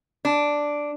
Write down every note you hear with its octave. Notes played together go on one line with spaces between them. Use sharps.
D4